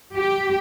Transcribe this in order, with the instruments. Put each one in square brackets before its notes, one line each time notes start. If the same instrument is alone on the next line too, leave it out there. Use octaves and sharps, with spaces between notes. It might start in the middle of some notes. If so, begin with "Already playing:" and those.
[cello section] G4